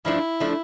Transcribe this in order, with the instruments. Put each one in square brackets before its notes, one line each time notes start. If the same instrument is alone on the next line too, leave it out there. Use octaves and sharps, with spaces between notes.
[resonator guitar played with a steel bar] G2 F3 A3 D4 [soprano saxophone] E4
[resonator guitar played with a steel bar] F3 A3 D4